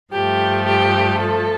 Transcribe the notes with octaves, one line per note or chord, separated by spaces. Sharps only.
G2 F3 A3 G4
G4
A4